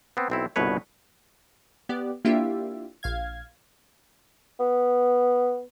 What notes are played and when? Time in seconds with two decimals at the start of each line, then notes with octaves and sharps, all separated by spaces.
0.17 B3 C4
0.30 B1 C4 E4
0.56 G1 C2 B2 B4 C#5
1.89 B3 G4 D5
2.25 A#3 D4 E4 F4 G4 E5
3.03 A#1 F5 G#6
4.60 B3